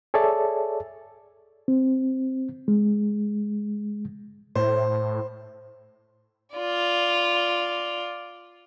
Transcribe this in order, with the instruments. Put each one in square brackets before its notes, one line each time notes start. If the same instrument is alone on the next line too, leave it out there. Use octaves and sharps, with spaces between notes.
[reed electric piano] G#4 A4 C#5 D5 E5 A5
C4
G#3
[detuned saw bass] A2 [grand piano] C5
[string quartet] F4 D5